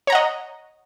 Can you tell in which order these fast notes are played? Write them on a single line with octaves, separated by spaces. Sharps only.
C#5 A#5 F#5 D#5